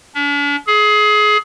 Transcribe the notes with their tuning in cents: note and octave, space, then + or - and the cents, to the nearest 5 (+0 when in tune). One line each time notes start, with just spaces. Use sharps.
D4 -45
G#4 +25